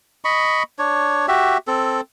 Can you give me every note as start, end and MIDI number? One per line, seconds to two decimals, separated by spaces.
0.25 0.63 75
0.25 0.63 83
0.25 0.63 85
0.79 1.26 62
0.79 1.26 73
1.28 1.57 66
1.28 1.57 67
1.28 1.57 76
1.68 2.01 60
1.68 2.01 69